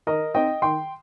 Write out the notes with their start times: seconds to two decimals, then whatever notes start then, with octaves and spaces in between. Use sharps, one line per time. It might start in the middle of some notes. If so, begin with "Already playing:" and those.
0.07 D#3 A#4 D#5
0.35 C4 D#4 D#5 G5
0.62 D#3 G5 C6